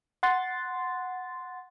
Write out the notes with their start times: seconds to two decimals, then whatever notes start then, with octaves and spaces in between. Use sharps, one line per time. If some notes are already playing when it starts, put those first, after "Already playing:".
0.23 F#5 C6 A6